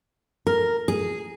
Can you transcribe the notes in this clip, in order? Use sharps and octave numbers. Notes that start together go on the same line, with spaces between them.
A#4
G#4